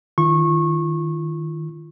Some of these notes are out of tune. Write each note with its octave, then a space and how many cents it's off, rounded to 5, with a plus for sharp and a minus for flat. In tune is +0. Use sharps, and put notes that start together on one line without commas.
D#3 +0 F4 -30 C#6 -25